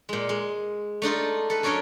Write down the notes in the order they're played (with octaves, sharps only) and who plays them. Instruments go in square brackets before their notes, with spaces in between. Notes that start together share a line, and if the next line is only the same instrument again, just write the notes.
[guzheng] A#2 G#3
G#3
A3 D4 D#4 F4
A4 B4
F#2 C#4 D4 A#4 C#5 D#5